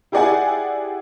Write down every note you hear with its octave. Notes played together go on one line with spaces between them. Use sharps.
E4 G4 G#4 D5 F#5 G#5